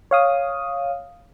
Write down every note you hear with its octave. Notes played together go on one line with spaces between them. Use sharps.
C#5 F5 D#6